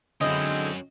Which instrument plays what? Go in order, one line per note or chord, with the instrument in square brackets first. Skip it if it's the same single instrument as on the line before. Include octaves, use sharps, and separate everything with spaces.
[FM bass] D3 [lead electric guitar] F#3 C#4 [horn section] G#3 C4 E4 [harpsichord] D#5